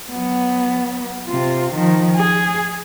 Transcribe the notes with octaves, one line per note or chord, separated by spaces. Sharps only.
F#3 B3
C3 F4
D#3 F3
G#4